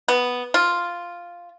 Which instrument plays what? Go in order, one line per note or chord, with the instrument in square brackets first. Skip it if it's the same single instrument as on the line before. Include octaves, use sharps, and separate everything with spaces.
[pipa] B3
F4